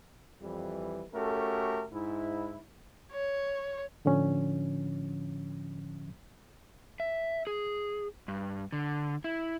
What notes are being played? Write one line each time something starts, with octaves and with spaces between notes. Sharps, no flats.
F2 E3 G3
A3 C#4 F#4 G4 A4 A#4
G#2 E4
C#5
A2 D3 F3 C#4
E5
G#4
G2
D3
E4